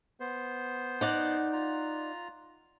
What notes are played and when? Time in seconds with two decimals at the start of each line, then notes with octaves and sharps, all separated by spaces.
0.20 B3 C5
1.01 D#4 D5 F#5
1.53 F4 A#5